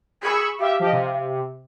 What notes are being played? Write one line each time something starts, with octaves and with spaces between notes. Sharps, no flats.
G#4 B5 C#6 E6
G4 E5 F5
F3 G4 D#5
C3